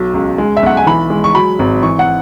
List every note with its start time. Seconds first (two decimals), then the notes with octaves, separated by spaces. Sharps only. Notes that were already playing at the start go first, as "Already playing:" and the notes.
Already playing: B1 F#3
0.14 C#2
0.38 G#3
0.57 E5
0.63 B1 F#5
0.77 G#5
0.86 E3 B5
1.10 G#3
1.24 C#6
1.35 F#3 B5
1.59 G#1
1.82 E3 C#6
1.99 F#5